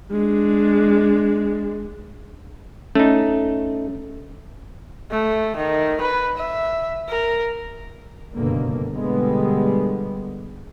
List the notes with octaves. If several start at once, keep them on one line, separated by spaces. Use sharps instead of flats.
G#3 D4
A3 C#4 D#4
A3
D#3
B4
E5
A#4
F#1 G2 B2 D3 A#3
B2 D3 G3 G#3 B3